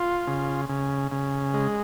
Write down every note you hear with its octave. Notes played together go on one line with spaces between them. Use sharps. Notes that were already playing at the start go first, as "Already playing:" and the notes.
Already playing: F4
C#3
C#3
C#3
G#3